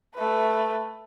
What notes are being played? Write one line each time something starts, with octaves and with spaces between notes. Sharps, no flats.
A3 B4